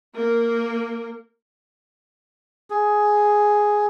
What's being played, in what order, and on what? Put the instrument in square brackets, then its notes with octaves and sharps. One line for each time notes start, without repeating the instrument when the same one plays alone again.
[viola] A#3 A#4
[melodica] G#4